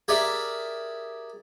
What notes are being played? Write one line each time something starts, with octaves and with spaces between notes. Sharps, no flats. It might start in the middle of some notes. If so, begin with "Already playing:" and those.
G4 G#4 A#4 D5 E5